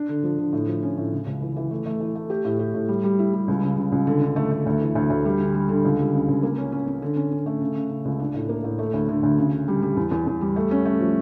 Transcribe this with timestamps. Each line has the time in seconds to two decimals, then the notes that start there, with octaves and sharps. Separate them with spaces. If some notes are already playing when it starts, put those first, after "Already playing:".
Already playing: D4
0.09 D3
0.24 F3
0.38 D3
0.53 A2
0.68 F3
0.83 C#4
0.97 A2
1.12 C#3
1.26 C#2
1.41 E3
1.57 E3
1.71 A3
1.86 A3
2.00 E3
2.15 A3
2.30 G4
2.45 A2
2.59 G4
2.74 A2
2.88 G3
3.04 G3
3.19 E4
3.33 G3
3.48 C#2
3.63 C#3
3.78 C#3
3.92 C#2
4.07 D3
4.22 D3
4.36 A3
4.51 A3
4.66 D2
4.81 E3
4.95 D2
5.10 D2
5.25 G3
5.40 D3
5.54 G3
5.69 D3
5.85 C#2
5.98 G3
6.14 C#3
6.28 C#2
6.43 A#3
6.58 C#4
6.72 C#4
6.87 C#4
7.02 D3
7.16 C#4
7.31 C#4
7.46 A3
7.61 C#3
7.76 C#3
7.90 C#3
8.05 C#2
8.19 D4
8.34 A2
8.49 A#3
8.64 A2
8.79 A3
8.94 D2
9.09 D3
9.23 D2
9.38 C#3
9.52 C#3
9.68 G3
9.82 G3
9.97 E2
10.11 E2
10.27 E2
10.41 G3
10.56 A3
10.71 C#4
10.85 A3
11.00 F3